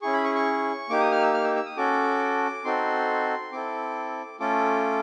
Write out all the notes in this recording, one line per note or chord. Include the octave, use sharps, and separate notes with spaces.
C#4 E4 G#4 C#6
B5
C#6
C#6
A#3 D#4 G4 D6
D#6
F6
E6
F6
E6
E6
D#6
C#4 F#4 A4 D6
C4 D#4 F#4 A4 C6
C4 E4 A4 D6
A3 C#4 F4 A4 D6